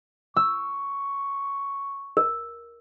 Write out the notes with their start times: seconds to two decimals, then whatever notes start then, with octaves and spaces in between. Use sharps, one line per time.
0.36 C#6 E6
2.17 A#4